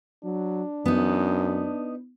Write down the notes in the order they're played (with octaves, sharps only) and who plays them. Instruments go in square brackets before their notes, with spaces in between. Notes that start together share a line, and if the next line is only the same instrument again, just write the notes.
[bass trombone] F#3 [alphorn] D4
[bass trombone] F#2 [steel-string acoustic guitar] B3 D#4